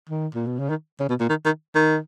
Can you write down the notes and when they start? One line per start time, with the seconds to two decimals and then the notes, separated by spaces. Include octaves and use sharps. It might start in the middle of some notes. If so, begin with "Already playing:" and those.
0.09 D#3
0.35 A#2
0.47 B2
0.59 C#3
0.70 D#3
1.00 C#3
1.09 B2
1.20 A#2
1.29 D#3
1.45 D#3
1.75 D#3